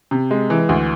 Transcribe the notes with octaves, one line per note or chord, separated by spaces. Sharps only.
C3
G#3
E3
D2